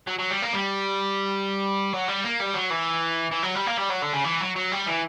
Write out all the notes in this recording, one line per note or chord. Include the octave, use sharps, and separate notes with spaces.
F#3
F#3
G3
A#3
G3
F#3
G3
A#3
G3
F#3
E3
E3
F#3
G3
A#3
G3
F#3
D3
C#3
E3
F#3
F#3
G3
E3